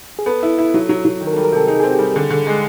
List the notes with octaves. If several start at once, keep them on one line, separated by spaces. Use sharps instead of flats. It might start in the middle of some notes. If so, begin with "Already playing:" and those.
G#4
B3 A4
E4
E4
F#3
F#3
F#3
D#3
A#4
A4
G3
A#4
C3 A4
D#4 G#4
G#4
C4
G4
G3 G#4
D3
D3
G#3